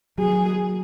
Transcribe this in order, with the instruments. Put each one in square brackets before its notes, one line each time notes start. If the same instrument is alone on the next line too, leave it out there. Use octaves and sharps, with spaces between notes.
[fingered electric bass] F#3 [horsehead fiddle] G#4